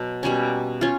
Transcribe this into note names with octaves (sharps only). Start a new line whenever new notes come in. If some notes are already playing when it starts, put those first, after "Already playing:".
Already playing: B2 F#3
B2 G3 A#3 C#4
C#4 F4